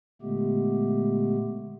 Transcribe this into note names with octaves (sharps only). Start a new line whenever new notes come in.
A#2 D3 G#3 A3 B3 G4